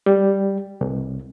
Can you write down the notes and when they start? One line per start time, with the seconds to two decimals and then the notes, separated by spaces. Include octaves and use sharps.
0.06 G3
0.81 C2